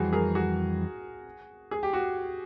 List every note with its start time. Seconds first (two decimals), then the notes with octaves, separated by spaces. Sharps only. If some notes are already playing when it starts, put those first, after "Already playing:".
Already playing: F2 E3 G3 F#4 G#4
0.13 G#4 A#4
0.35 F#4 G#4
1.71 G#4
1.83 G4
1.93 F#4